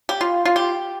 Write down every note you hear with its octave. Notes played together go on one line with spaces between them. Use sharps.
G4
F4
F4
G4